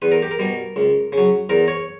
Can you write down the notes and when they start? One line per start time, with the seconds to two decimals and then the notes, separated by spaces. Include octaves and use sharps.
0.02 E2 B4
0.12 A#4
0.22 G4
0.31 A#4
0.39 B2 G3
0.76 C#2
1.12 C#3
1.18 F#3
1.49 E2 A#4
1.68 C#5